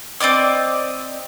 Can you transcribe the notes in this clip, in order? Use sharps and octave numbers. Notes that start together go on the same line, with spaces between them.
C4 D5 D#5 D6